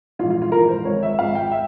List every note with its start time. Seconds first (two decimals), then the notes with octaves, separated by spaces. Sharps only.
0.19 A#1 G#2 E3 F4
0.30 F4
0.42 F4
0.52 A#1 G#2 E3 A#4
0.69 C5
0.85 G#1 G#2 F3 C#5
1.03 E5
1.18 G#1 G#2 F3 F5
1.35 G5
1.52 E5